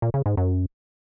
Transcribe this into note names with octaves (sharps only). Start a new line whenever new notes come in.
A#2
C#3
G#2
F#2